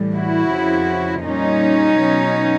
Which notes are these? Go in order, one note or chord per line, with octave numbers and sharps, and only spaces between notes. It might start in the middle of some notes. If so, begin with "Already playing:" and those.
Already playing: A2 E3 G3
E4 F#4
F2 C#3 F3
A#2 G3 C#4 D#4
B2 F#3